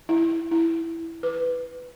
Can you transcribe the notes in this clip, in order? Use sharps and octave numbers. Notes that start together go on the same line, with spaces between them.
E4
E4
B4